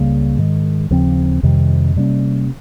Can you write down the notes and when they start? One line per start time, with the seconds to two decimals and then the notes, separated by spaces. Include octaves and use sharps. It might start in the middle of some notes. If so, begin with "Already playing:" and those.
Already playing: C#2 C#3 G3 A#3
0.38 G#2 D#3 G#3
0.90 D#2 C#3 F3 C4
1.43 F2 C3 D#3 G3
1.96 C3 G3 A#3 C#4